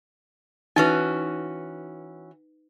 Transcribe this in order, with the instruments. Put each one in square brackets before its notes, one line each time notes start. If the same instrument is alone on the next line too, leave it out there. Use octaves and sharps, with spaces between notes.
[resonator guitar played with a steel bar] E3 C#4 F#4 [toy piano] D#4 B4